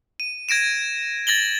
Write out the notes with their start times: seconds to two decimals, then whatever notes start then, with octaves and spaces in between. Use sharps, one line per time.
0.20 D#7
0.49 G#6 A#6 D7 E7
1.27 A6 A#6 F#7 G7